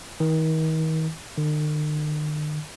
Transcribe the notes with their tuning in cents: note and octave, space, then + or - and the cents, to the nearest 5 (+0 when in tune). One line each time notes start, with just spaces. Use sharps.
D#3 +40
D#3 -45